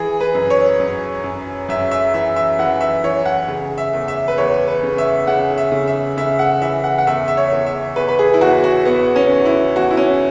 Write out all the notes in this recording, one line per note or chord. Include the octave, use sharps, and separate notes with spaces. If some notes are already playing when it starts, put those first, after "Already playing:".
Already playing: E3 G#4
B4
F#2
C#5
F#2
F#2
F#2 E5
E5
E3 E5
E5
E3 F#5
E5
E3 C#5
F#5
C#3
E5
E2
E5
B4
E2 C#5
B4
C#3
E5
C#3 F#5
E5
C#3
E5
C#3 E5
F#5
E3 E5
F#5
F#5
E2 E5
E5
C#5
E2
E5
E2 B4
B4
G#4
E4
E2 F#4
F#4
E2 B3
C#4
E2
E4
E2 F#4
E4
C#4